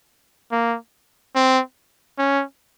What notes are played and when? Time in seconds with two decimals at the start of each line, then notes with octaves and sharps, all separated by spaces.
0.52 A#3
1.35 C4
2.19 C#4